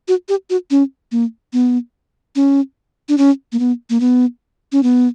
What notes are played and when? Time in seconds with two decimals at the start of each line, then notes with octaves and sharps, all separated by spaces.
0.08 F#4
0.29 G4
0.50 F#4
0.71 C#4
1.12 A#3
1.53 B3
2.36 C#4
3.09 D4
3.18 C#4
3.52 A#3
3.59 B3
3.90 A#3
4.00 B3
4.72 C#4
4.83 B3